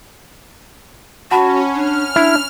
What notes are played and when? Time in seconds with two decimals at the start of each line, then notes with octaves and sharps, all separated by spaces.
1.31 C#4 F#4 F#5 A5 B5
1.75 D4 F6
2.16 D4 E4